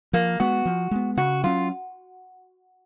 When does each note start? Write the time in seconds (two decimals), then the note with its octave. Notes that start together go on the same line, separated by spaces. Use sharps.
0.13 F3 A#3
0.40 G#3 B3 F#4
0.66 F3
0.91 G#3 B3
1.17 C#3 F#4
1.44 F#3 C#4 F4